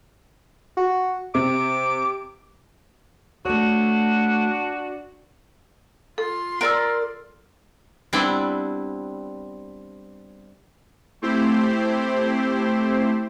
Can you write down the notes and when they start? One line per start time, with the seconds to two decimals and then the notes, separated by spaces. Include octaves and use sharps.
0.77 F#4
1.35 C3 D6
3.45 A3 D4 F#4 C#5
6.18 F4 A4 C6
6.61 A#4 D5 E6
8.13 G3 B3 C4 D4 E4
11.22 A3 C4 E4 G4 C5